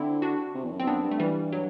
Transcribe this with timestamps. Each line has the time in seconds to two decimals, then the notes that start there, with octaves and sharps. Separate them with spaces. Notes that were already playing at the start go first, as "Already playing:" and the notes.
Already playing: D3 C4 E4
0.22 D4 F#4
0.55 C3
0.65 E2
0.71 F#2
0.80 C4
0.82 E2
0.87 F#2 B3 D4
1.03 G2
1.12 A3
1.20 E3 G3
1.52 F#3